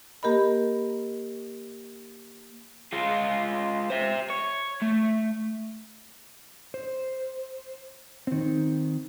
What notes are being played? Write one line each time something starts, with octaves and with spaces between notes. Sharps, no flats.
A#3 G4 A#4 D#5 B5
G#3 F4
C5 E5
C#5
A3
C5
D#3 C4